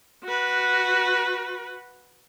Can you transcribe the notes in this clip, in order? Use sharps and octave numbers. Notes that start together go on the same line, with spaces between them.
F#4 B4